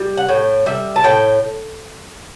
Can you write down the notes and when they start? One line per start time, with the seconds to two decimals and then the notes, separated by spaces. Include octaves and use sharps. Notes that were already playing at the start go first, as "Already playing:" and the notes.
Already playing: G3
0.17 F#5
0.29 A2 G5
0.66 G3 E5
0.96 A5
1.04 A2 G5